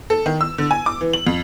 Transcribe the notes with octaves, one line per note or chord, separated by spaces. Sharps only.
A4
D#3
E6
D3
G#5
D6
E3
F#7
F2